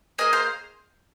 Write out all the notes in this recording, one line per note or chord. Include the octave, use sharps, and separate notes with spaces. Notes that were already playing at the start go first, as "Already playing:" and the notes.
A#3 G#4 D#5 G#5
C5 F5